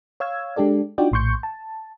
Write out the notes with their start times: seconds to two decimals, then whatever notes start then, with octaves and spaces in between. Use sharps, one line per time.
0.20 C#5 F5 E6 G#6
0.56 G#3 D4 G4 A4 D5
0.98 D4 D#4 F4 F#4 D5 G5
1.12 A#1 A2 C6 C#6 G6 C#7
1.43 A5